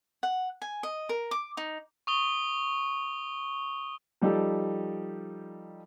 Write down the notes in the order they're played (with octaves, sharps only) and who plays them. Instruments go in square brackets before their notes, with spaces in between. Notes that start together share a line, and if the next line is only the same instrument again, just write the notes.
[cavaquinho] F#5
G#5
D#5
A#4
D6
D#4
[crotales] C#6 D#6 G7
[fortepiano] F3 G3 D#4 G4 A4